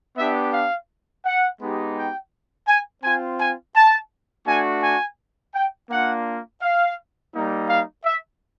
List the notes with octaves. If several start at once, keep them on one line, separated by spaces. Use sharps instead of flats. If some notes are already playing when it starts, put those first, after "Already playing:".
B3 D4 G4 E5
F5
F#5
G#3 B3 D#4 G4
G5
G#5
C4 F4 G#5
G#5
A5
A3 D4 F#4 G#5
G#5
G5
A#3 D4 F4 F#5
F5
G3 A#3 D#4
F5
E5